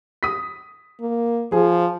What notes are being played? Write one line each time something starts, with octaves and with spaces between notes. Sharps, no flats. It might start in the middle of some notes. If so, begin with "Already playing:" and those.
D#6 B6
A#3
F3 G#4